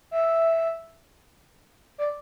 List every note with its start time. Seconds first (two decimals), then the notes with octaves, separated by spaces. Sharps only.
0.11 E5
1.98 D5